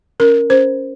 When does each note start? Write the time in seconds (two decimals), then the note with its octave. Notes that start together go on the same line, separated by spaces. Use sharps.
0.20 C#4 A#4
0.50 C#4 C5